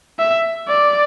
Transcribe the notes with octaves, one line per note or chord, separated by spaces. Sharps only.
E5
D5